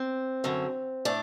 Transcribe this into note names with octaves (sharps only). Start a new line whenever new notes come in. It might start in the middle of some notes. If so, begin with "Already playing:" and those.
Already playing: C4
F#2 D3 F#3
A2 D4